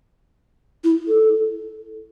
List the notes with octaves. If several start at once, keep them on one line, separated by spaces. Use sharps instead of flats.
E4
A4